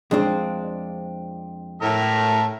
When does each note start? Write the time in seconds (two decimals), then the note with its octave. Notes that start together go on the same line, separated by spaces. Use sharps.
0.11 F2 G#3 C4 D4
1.82 A2 A4 A#4 E5